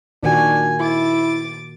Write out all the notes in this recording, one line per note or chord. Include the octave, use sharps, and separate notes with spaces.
A#2 D#3 D4 F#4 G#5
E4 D6 A6